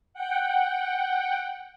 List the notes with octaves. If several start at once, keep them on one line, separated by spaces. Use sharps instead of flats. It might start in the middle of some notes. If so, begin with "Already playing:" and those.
F#5 G5